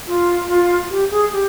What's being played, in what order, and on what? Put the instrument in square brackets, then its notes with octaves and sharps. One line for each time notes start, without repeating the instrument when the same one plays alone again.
[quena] F4
F4
G4
G#4
G4